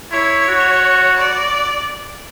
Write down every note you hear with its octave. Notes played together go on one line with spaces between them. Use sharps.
E4 C#5
F#4
D5